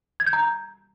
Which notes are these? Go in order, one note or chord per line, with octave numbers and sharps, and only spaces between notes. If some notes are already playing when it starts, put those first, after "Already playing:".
G#6
G6
A#5